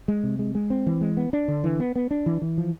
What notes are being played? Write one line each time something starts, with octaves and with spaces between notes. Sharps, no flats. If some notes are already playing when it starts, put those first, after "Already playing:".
G#3
C3
G#3
G#3
C4
E3
G#3
B3
D4
D3
E3
B3
B3
D4
E3
E3
F3